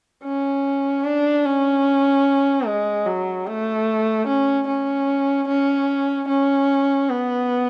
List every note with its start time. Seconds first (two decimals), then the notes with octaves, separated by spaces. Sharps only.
0.24 C#4
1.04 D4
1.45 C#4
2.66 G#3
3.06 F#3
3.47 A3
4.27 C#4
4.67 C#4
5.48 C#4
6.28 C#4
7.10 B3